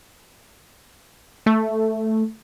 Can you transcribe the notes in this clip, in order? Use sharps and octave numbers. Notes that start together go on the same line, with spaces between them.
A3